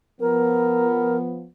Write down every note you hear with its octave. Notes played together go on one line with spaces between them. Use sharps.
F3 B3 A#4